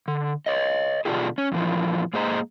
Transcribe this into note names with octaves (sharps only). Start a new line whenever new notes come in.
D3
C#5 D#5
B2 D3 D4 F4 G4 G#4
C#4
F2 A#2 E3 F3
G#2 A#3 G#4 C5 D#5 A#5